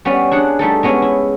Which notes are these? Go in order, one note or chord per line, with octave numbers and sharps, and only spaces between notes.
G3 B3 C#4
D4 G#4 F#5
G3 A3 D#4 A4
G#3 B3 C#4 E4
E4